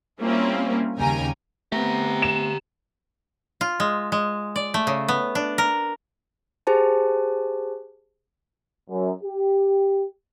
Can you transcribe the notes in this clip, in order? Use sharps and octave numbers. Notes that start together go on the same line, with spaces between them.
G3 A#3 C4 C#4 E4 F4
D#2 C#3 G3 G5 G#5 A#5
A3 B3 C4 G4 A#5
E7
F4
G#3
G#3
D5
A3
C#3
B3
D4
A#4
G4 G#4 C5 A5
F#2
G4